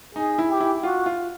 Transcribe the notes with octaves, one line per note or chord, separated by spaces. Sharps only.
D#4 G#4
E4
G4
E4
F4 F#4
F4